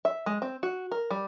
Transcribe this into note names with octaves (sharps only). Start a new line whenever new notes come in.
E5
G#3
C4
F#4
A#4
G3